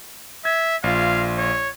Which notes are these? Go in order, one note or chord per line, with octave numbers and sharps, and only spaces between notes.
E5 G#6
A#1 F4 F5
C#5